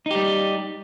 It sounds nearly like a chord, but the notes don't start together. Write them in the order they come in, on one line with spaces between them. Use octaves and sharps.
D#4 G4 G3